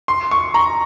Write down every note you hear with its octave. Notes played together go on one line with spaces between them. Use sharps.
C6
C#6
A#5